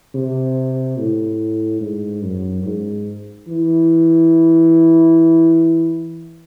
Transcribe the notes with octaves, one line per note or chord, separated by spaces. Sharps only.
C3
A2
G#2
F#2
G#2
E3